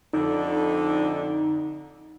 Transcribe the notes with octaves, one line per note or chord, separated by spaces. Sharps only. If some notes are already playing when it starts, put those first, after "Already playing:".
F2 D3 D#4